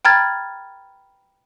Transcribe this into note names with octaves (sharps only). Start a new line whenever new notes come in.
G5 A#5 B5 F6 G#6 A6